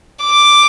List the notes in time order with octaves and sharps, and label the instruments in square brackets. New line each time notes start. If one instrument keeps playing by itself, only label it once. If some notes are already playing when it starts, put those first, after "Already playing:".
[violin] D6